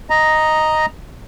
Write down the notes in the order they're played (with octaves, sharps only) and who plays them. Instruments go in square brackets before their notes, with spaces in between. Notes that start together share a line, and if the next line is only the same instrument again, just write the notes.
[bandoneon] D#5 A#5